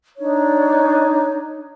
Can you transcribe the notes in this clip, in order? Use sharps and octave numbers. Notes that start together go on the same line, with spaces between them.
D4 D#4 C#5